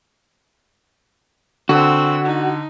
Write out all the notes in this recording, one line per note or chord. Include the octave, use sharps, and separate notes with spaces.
D3 C4 F#4 E6
D#4